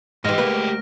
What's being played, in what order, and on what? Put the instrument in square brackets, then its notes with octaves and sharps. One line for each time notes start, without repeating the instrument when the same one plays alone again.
[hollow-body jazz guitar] G#2 [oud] E3 D#5 [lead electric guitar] G#3 G4 [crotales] F6 A#6
[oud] D2 A#3 [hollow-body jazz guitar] B4